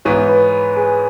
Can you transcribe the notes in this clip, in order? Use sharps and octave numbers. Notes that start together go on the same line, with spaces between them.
G#2 E3 B3 C#5 C#6
B4 B5
B4 B5
G#4 G#5